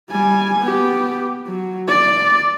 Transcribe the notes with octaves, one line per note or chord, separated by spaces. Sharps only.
G3 G#5
B3 G4
F#3
D5